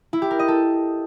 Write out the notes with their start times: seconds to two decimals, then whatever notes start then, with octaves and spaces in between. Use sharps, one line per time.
0.13 E4
0.22 G4
0.31 A#4
0.39 D#5
0.48 A4